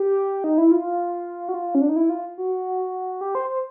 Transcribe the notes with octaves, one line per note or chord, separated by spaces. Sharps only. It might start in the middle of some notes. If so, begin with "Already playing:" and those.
Already playing: G4
D#4
E4
F4
F#4
F4
C#4
D4
D#4
E4
F4
F#4
G4
C5
C5